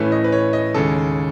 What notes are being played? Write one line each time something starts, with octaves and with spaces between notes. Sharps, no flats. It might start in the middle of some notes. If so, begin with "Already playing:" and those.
Already playing: A2 E3 A3 C#4 B4
D#5
B4
C#5
D#5
D#2 C#3 G#3 A4